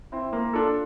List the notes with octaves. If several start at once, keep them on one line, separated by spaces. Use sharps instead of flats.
C4 E4
A#3
D4 F4 A4